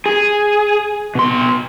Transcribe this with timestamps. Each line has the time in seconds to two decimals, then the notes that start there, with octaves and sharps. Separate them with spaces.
0.06 G#4
1.15 B2 C6